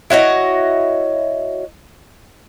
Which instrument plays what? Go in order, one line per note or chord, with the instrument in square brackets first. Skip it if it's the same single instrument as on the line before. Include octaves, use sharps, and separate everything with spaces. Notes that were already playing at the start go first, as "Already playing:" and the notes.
[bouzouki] E4 F#4 C#5 D#5